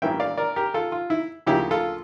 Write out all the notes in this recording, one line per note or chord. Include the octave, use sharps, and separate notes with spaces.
A1 G2 E3 A#3 C#4 E5 G5
D5 F5
A#4 D5
G4 A#4
F4 A4
F4
E4
D2 C#3 F3 A#3 C#4 E4 G4
F4 A4